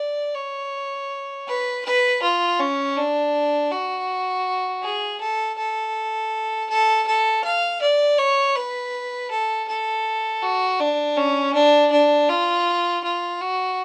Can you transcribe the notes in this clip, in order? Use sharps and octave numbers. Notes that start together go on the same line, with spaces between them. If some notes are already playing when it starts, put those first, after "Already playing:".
Already playing: D5
C#5
B4
B4
F4
C#4
D4
F#4
G#4
A4
A4
A4
A4
F5
D5
C#5
B4
A4
A4
F#4
D4
C#4
D4
D4
F4
F4
F#4